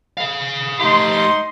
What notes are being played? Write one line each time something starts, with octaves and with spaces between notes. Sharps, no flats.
G#4 F5
A3 D#4 G4 C6